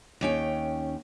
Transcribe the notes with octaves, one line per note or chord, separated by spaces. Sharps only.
D#2 C#4 G5